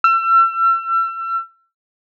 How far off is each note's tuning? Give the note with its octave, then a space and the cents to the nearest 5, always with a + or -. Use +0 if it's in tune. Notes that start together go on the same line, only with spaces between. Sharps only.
E6 +35